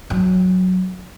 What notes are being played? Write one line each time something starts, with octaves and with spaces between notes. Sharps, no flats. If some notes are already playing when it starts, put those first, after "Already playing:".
F#3